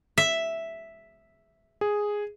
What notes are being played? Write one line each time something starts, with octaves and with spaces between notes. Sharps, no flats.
E5
G#4